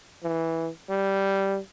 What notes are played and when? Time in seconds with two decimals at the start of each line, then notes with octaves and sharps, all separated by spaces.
0.23 E3
0.90 G3